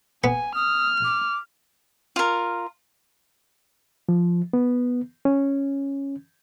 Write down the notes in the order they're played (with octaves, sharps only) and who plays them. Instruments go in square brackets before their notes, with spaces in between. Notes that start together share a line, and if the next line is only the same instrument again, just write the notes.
[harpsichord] B3 [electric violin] G#5
[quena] D#6 [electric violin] F6
[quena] D6
[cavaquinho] F4 A#4
[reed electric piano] F3
B3
C#4